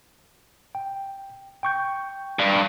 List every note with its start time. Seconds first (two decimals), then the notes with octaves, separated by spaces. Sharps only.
0.75 G5
1.63 G5 C#6 G6
2.39 G2